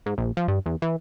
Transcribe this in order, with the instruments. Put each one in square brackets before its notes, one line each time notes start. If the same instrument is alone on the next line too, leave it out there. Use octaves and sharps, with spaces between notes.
[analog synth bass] G#2
A#1
F3
G2
E2
E3